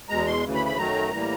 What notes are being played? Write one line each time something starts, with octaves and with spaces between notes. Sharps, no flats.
E2 B2 G#3 A#5
C6
D2 C#3 E3
B5
B5
F#2 D#3 F#3 A3 A#5
A2 E3 G3 A#3